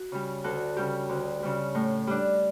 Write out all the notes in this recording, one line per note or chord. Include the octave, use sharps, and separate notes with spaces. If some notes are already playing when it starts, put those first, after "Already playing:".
Already playing: F#4
C#3 G3
D2 F#4 A4
C#3 G3 G4
D2
C#3 G3
A2
G3 D4